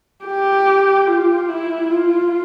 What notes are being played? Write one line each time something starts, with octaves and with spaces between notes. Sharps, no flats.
G4
F4
E4
F4